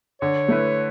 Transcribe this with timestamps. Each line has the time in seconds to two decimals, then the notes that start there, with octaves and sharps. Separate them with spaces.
0.21 D3 C#5
0.48 A3 E4 B4